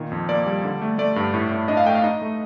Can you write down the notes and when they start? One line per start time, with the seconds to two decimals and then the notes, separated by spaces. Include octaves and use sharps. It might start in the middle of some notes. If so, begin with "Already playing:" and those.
Already playing: A#2 D#3
0.12 F2
0.29 A#3 D5
0.47 G3
0.64 D3
0.82 A3
0.98 A3 D5
1.16 G2
1.34 A2
1.51 A2
1.68 D4 D#5
1.77 F5
1.86 A3 G5
1.95 F5
2.03 D#4 D#5
2.22 A3